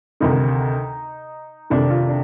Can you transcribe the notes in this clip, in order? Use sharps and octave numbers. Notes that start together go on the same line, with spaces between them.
D2 C3 D#3 D#4
F2 C3 D#3 D4
F4
D4